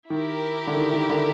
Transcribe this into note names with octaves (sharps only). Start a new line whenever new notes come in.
D#3 E4 G4 A#4
D3
D#3
D#3
D3